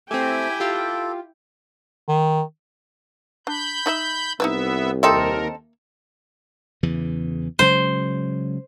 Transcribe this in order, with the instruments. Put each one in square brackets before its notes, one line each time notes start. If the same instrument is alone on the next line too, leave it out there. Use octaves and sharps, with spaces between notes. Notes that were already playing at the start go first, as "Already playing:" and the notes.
[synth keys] A3 C4 [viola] E4 G5 [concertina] G4 G#5
[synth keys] F4 G4 [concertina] A4
[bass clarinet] D#3
[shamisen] D4 [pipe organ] B5 G6
[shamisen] D#4 D#5 E5
[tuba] C2 [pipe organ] B3 E5 [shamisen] D#4 E4 B4
[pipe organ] D#2 A#4 [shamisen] A#3 E5 [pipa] C4 D#4 A4
[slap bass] E2 C#3 E3
[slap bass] C#3 F#3 G#3 [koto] C5